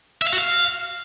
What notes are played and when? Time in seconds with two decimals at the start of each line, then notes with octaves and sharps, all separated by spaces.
0.22 E5
0.27 F5
0.33 F#4
0.38 F5